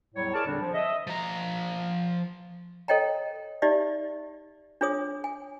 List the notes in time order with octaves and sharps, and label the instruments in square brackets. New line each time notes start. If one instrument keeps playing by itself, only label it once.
[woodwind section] E2 A2 F#3 G3 C#5
E4 G#4 A#4 C#5 D5 A5
E2 A#2 D3 G3 C4 D4
F3
D#5 E5
[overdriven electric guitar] F3 A#5
[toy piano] A4 C#5 D#5 G5 A#5
D#4 G4 D5 E5
D4 F4 G#4 C#5 D#6
G#5